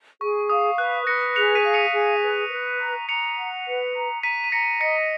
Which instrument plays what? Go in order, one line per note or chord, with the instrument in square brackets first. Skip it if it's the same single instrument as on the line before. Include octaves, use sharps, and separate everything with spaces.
[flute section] G#4 [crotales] C#6
[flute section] F5 [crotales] D#6
[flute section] B4 [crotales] F#6
[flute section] B4 [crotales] A#6 C#7
[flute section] G#4 [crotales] C#7 F7
[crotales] F7
B6 D#7
[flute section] F5
[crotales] C#7 F7
[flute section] G#4
B4
B4
A#5
[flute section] A#5 [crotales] C#7 F7
[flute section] F#5
B4
A#5
[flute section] A#5 [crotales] B6 D#7
[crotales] D#7
[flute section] A#5 [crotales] A#6 C#7
[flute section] D#5 [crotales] A#6 C#7